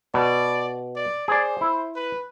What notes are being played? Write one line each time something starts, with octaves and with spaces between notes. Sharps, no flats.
B2 D5
D5
G#4 C5 D5
E4
B4